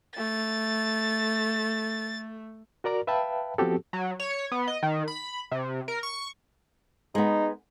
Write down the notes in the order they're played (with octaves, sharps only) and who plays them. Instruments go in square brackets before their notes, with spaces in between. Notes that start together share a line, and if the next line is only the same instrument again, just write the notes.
[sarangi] A3 [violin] A6
[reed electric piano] F#4 A#4 D5 A#5
B4 E5 F5 G5 A5 B5
F3 B3 C4 F#4 G4 A4
[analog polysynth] F#3
C#5
B3
D#5
D#3
B5
C3
A#4
C#6
[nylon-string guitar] G#3 B3 [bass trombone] D#4